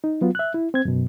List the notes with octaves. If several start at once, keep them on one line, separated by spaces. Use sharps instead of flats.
D#4
F#3 B3 F4
E5 F#6
E4
C4 G#6
F#2 B2